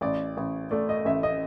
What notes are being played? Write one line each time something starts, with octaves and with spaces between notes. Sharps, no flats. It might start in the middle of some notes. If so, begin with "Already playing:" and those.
A1 D5
A1
A3 D5
D#5
A1 E5
D#5